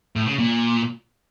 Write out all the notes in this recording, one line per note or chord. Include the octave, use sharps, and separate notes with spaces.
A2
C#3
A#2